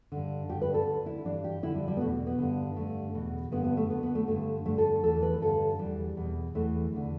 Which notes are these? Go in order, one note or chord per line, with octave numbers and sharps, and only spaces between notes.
G2 D3
G2 D3 G4
B4
A4
D2 D3
E4
G2 E3 D4
G4
G2 D3 E4
G3
G3
B3
E2 B2 A3
B3
G2 D3
G2 D3 A3
E2 B2
G2 D3 B3
B3
A3
D2 D3 B3
B3
A3
G2 D3 A3
G2 D3 A3
A4
E2 E3 A4
B4
G2 D3 A4
E2 E3 G3
E2 B2
E2 E3 A3
E2 D3